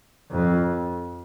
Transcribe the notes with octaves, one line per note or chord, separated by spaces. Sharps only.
F2